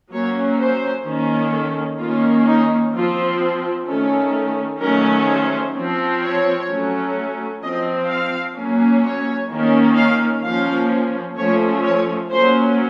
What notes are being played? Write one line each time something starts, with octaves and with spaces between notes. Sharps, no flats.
F#3 A#3 C#4 C#5
C5
D#3 A#3 C#4
A4
D#3 A#3 C#4 F4
D#4
F3 C4 F4
D#3 A3 C#4 A4
D#3 F#3 A3 C#4 A#4
C5
F3 C4
C#5
F#3 A3 C#4
F3 C4 D#5
F5
F#3 A#3 C#4
C#5
D#3 A#3 C#4
F5
F3 A#3 C#4 F5
F3 A3 C#4 C#5
C#5
F#3 A#3 C#4 C5